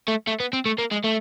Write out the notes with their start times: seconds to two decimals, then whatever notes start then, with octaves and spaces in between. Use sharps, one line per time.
0.08 A3
0.28 A3
0.40 B3
0.53 C4
0.66 A3
0.78 A#3
0.91 G#3
1.04 A3